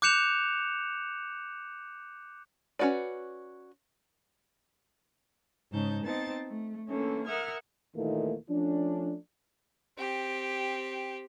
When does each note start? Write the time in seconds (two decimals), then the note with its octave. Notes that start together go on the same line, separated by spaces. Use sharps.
0.02 D6 F#6 G6 C#7 E7 F7
2.79 C#4 D4 F#4 B4 D5
5.71 G#2 C#3 D#4 A5 G6
6.03 B3 C4 D#4 A5 A6
6.46 A3
6.88 D3 E3 A3 A#3 C#4
7.26 A#4 E5 F#5 D#6 F6 G#6
7.95 D#2 A#2 D#3 E3 A3 A#3
8.50 F3 A3 C#4 D4
9.98 C4 G4